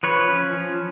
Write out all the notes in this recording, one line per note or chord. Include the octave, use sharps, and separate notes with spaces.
F3 B4 C#5
C#4
F3